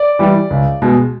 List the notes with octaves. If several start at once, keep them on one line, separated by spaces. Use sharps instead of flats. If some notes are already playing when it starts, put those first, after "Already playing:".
Already playing: D5
E3 G3
C#2
B2 G#3